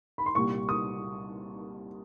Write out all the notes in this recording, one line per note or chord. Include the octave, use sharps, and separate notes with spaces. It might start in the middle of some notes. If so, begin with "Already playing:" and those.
B5
C6
C2 A#2 G3 C#6
D#6